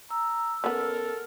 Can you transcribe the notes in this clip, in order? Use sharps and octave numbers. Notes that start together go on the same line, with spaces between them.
A#5 E6
C#3 B3 A4 A#4